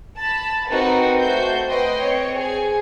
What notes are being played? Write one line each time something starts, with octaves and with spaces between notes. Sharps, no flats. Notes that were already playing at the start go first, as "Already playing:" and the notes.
A5 B5
C4 D#4 F#4 A#4 B4
A3 F#4 C5 G6
B4 D#5 G5 C6
C4 C#5
G#4 G#5